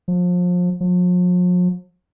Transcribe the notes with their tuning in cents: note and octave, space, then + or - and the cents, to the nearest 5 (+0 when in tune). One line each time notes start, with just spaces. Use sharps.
F3 +30
F3 +45